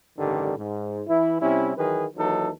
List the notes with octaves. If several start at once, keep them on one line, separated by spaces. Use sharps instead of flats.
A1 G2 D3 D#3 G3
G#2
E3 E4
C3 G3 C#4 E4
D#3 E3 F#3 G#4 B4
D#2 E3 F#3 D#4 A4